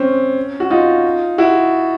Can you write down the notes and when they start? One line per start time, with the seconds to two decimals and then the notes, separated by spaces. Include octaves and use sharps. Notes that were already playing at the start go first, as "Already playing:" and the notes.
Already playing: C4 C#4
0.60 F#4
0.70 D#4 F4
1.38 E4 F#4